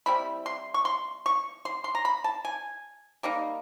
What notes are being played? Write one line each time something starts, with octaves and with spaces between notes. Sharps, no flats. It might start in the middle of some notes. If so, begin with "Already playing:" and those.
G3 C4 E4 B5
C6
C#6
C6
C#6
C6
C6
A#5
B5
A5
G#5
G3 A#3 D#4